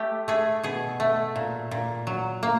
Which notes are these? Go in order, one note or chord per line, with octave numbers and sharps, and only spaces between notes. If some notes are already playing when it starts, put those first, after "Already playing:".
Already playing: A3 G4
A3 G#4
B2 G#4
A3
A#2
A#2
F#3
A#3